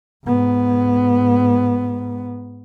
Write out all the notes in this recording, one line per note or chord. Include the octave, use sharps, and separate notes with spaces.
G#2 B3